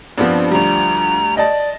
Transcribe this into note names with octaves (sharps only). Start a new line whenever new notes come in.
G2 F3 B3 C4 D4
D2 G3 A#5
D5 D#5 A5